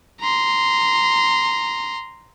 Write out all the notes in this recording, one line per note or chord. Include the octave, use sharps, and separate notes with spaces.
A#5 C6